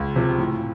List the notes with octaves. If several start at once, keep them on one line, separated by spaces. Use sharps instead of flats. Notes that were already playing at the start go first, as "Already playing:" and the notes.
Already playing: C#2
C3 F3
A2